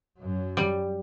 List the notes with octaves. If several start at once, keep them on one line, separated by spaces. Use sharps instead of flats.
F#2 F#3
G3